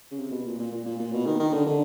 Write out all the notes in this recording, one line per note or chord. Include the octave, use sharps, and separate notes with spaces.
C#3
C3
B2
A#2
A#2
A#2
A#2
A#2
B2
D#3
D#3
D3
D3